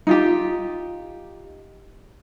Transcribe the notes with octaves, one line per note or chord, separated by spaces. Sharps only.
D#4 F4 G4